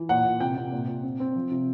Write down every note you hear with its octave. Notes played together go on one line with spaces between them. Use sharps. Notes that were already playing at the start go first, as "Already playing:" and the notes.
Already playing: E3
A#2 F#5
A#2
C3 G5
C3
A#2
A#2
C4
C4
F3
C3